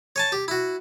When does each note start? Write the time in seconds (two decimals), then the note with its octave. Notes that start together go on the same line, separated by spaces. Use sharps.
0.16 C#5 G#5 A5
0.32 G4
0.48 E4 F#4